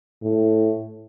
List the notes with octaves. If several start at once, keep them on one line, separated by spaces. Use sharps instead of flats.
A2